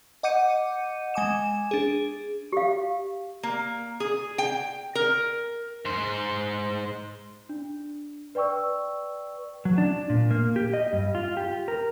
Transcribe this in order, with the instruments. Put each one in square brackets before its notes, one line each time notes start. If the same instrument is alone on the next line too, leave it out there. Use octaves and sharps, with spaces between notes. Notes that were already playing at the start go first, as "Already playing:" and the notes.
[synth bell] D#5 F#5 D6 G6 C#7 D#7
G#3 G#5 D6 E7
D4 G#4
[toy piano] G4 F5
[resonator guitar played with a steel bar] A#3
G#4
G5
A#4
[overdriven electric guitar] G#2 C5
[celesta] D4
B4 D5 G5 C#6 E6
[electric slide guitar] F#3
D4
A#2
A#3
G4
D#5
G2
F4
G4
A#4